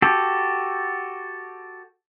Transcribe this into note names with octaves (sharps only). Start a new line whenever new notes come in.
F#4 G4 A4